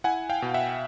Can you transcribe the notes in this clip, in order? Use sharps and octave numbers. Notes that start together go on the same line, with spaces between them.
E4 F#5 G#5
F5 G5
B2
E5 F#5